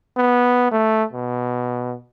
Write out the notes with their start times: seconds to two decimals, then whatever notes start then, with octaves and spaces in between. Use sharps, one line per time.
0.17 B3
0.71 A3
1.13 B2